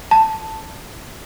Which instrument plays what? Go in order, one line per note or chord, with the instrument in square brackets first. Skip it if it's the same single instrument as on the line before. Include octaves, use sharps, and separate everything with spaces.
[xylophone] A5